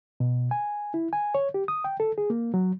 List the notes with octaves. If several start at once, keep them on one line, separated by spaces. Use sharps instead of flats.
B2
G#5
E4
G#5
C#5
G4
D#6
G5
A4
G#4
A#3
F#3